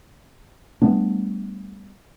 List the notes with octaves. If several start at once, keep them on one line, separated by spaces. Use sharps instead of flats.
G3 A3 B3 D4